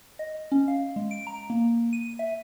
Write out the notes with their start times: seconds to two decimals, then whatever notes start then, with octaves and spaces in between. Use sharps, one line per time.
0.19 D#5
0.52 C#4
0.68 F5
0.96 G#3
1.11 D7
1.27 A#5
1.50 A#3
1.93 D#7
2.19 E5